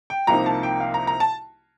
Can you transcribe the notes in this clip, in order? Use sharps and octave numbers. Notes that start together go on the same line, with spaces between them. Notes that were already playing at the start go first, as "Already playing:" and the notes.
G5
C2 C3 F3 A#3 D#4 A#5
A5
G5
F5
A#5
A#5
A5